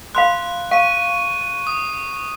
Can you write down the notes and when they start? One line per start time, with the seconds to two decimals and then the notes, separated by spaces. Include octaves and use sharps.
0.15 F5 B5 C6 F#6
0.71 F5 C#6 D#7
1.67 D#6